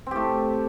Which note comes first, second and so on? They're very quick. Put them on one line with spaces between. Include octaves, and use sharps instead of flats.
C4 G4 A3